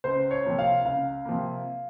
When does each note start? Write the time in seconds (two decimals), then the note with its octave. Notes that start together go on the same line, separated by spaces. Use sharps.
0.04 C#2 C5
0.31 C#5
0.44 C3 F3 A#3
0.59 F5
0.85 C#2 F5
1.25 C3 F3 A#3